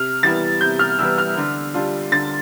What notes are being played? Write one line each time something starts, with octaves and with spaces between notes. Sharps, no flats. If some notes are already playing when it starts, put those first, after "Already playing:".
Already playing: C3 F6
E3 G3 B3 E4 A6
C3 G6
F6
E3 G3 B3 E4 E6
F6
D3
G3 D4 F4
D3 A6